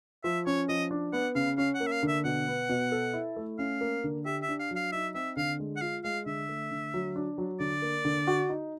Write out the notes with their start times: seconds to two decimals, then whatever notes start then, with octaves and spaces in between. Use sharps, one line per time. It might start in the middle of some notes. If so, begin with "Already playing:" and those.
0.24 F3 E5
0.46 C#4 C#5
0.69 F3 D#5
0.91 D4
1.13 B3 F#5
1.35 C#3 F5
1.58 C#4 F5
1.75 F#5
1.80 A#3
1.87 E5
1.91 F5
2.03 D3
2.08 E5
2.24 B2 F#5
2.47 B3
2.69 B2
2.92 A4
3.13 E4
3.37 A3
3.59 C#4 F5
3.81 A#3
4.04 D3
4.25 G4 E5
4.42 E5
4.48 D4
4.59 F5
4.71 F#3 F5
4.92 D#4 E5
5.14 C4 E5
5.37 D3 F5
5.60 G#3
5.77 F#5
5.81 F4 F5
6.04 G#3 F5
6.26 D3 E5
6.49 A3
6.71 D3
6.94 F#3
7.16 D4
7.38 F#3
7.60 D3 D5
7.82 A#3
8.05 D3
8.27 F#4
8.49 D#4